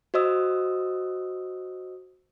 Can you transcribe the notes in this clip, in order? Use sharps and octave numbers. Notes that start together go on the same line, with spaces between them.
F#4 C5 D#5 D#6 E6